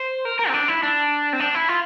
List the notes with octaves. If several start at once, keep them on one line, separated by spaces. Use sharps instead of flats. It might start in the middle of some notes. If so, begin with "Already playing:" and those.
Already playing: C5
A#4
A#4
C4
D4
E4
D4
C4
D4
E4
F4